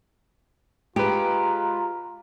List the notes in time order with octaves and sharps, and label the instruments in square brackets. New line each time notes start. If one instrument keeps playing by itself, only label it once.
[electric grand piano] G#3 B4 [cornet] F4 [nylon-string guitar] G4 [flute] A#5